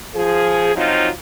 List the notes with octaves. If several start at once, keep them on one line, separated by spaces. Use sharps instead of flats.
F3 G#4
F3 F#3 C4 D#4 F4